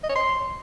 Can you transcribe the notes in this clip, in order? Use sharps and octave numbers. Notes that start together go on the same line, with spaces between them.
D#5
C#5
C6